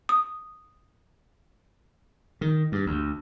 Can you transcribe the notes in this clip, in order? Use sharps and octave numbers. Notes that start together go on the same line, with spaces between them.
D#6
D#3
G2
D2